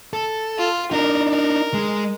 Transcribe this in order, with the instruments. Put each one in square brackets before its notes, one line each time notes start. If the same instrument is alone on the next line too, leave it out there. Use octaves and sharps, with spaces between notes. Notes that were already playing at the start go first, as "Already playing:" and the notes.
[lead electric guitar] A4
[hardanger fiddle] F4
[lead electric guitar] D4 D#4 [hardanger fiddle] A#4
[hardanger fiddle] A#4
[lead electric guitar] G#3